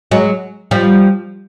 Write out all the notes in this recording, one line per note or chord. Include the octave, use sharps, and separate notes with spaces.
F#3 G#3
F3 G3